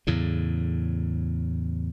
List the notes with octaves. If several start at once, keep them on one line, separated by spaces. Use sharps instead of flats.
E2 A2 C#3